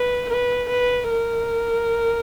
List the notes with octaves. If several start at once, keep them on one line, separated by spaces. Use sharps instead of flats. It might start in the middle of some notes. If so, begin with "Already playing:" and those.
Already playing: B4
B4
B4
A#4